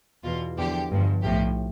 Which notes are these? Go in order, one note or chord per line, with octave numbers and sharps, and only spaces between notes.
E2 B2 F4
E2 D3 F3 G4
G1 G2 F3
B1 A2 F3 G4